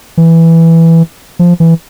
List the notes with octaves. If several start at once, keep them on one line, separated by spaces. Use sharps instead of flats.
E3
F3
E3